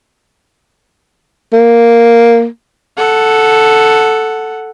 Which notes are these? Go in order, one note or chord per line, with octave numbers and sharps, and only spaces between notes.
A#3
A4 F#5